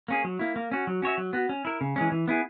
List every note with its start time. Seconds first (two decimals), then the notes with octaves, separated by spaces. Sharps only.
0.08 A#3 C#4 G#4
0.24 F#3
0.39 A#3 E4
0.56 A#3
0.72 C#4 F#4
0.87 F#3
1.02 C#4 F#4 C#5 E5
1.18 F#3
1.33 B3 F#4
1.49 C#4
1.65 E4 A#4
1.81 C#3
1.96 E3 G#3 C#4
2.12 E3
2.28 B3 E4 G#4